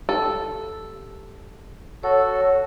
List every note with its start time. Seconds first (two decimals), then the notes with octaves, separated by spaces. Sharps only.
0.09 G4 A4
2.03 F#4 A4 C#5